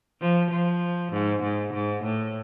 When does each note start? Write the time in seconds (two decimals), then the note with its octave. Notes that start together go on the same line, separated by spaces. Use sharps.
0.21 F3
0.50 F3
1.12 G#2
1.43 G#2
1.73 G#2
2.03 A2